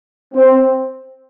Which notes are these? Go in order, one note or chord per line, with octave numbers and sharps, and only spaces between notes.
C4